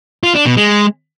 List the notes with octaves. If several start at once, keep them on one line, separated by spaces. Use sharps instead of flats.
F4
D4
B2
G#3